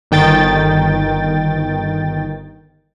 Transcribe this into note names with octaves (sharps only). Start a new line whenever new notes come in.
G1 D#3 G5 A6